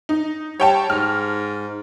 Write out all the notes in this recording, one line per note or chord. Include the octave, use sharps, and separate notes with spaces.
D#4
G3 C#5 G5 A5
G#2 F6